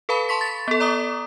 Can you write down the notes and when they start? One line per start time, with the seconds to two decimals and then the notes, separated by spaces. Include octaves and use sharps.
0.09 A4 B4 F5 A5 B5
0.29 A5 C6 C#6 B6
0.41 A6
0.68 B3 A4
0.80 D5 A#5 D6 D#6